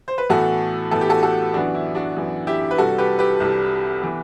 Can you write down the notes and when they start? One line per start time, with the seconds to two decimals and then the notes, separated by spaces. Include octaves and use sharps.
0.08 C5
0.18 B4
0.29 A2 E3 B3 F#4 A4
0.91 A2 E3 B3 A4
1.01 G4
1.09 F#4 A4
1.23 F#4 A4
1.54 F#2 E3 B3 D4 F#4
1.74 E4
1.95 D4 F#4
2.16 F#2 E3 B3
2.47 E4 G4
2.71 B4
2.78 C2 C3 G3 F#4 A4
2.98 G4 B4
3.19 G4 B4
3.40 C2 C3 G3
4.02 E3 B3